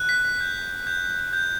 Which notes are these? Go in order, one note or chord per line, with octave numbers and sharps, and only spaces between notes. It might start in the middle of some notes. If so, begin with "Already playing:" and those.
Already playing: F#6
B6
G6
G6
G6